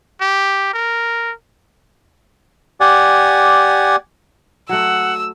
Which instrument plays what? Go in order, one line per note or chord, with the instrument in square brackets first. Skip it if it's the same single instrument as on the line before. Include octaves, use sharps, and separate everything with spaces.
[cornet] G4
A#4
[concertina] G4 D5 F#5 G#5
[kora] F#3 A3 [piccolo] F#5 [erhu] E6